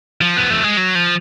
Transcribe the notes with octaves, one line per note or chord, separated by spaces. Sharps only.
F3
B3
A3
G#3
F#3
F3